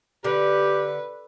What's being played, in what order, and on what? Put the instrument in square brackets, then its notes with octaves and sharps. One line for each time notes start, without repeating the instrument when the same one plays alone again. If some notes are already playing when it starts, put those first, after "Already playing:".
[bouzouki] D3 [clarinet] G4 [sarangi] B4